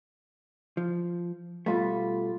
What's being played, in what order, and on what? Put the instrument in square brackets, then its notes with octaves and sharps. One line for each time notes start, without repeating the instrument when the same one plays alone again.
[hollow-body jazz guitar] F3
[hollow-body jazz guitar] B2 G3 A3 [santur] F4 B5 D6